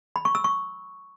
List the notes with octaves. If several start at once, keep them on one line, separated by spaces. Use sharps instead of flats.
B5
C#6
E6
C#6